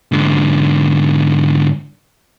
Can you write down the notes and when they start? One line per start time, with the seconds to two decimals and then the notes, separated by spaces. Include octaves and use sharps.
0.12 G#2 D3